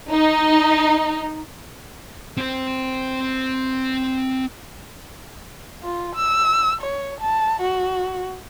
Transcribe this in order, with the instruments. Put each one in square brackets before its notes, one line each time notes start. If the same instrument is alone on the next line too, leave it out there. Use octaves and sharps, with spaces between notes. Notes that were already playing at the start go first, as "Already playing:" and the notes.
[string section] D#4
[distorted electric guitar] C4 C5
[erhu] F4
E6
C#5
A5
F#4